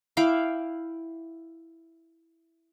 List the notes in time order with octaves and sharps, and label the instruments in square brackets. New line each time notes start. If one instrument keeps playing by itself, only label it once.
[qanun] E4 F5 G5 D6